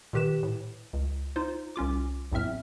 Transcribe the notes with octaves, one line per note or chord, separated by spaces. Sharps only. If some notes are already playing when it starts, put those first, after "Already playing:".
A#2 D#3 G4 B4 E7
A2
C#2
D#4 F4 C5
C2 C#4 F4 D6
B1 E2 A2 C4 E5 F6